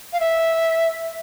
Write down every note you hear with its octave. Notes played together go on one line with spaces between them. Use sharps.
F5
E5